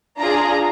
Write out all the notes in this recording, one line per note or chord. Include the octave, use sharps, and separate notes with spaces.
D4 F4 G#4 A#5